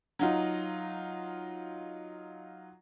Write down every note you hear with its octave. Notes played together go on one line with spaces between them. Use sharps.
F#3 D#4 F4